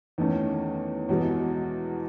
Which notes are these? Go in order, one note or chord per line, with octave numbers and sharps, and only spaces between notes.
E2 D#3 A3 C#4
E2 B2 G#3